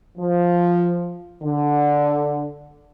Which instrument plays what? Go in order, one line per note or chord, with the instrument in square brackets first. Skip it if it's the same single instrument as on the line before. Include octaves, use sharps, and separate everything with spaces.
[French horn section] F3
D3